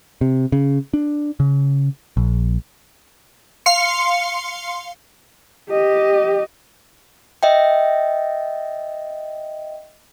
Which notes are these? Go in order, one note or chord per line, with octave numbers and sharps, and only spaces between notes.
C3
C#3
D4
C#3
A#1
F5 C6 C#7
G4 D#5
D#5 E5 G5